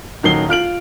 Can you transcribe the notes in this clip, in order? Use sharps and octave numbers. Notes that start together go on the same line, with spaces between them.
D#1 D#3 F#3 C7 G7
F4 F6 D7 F#7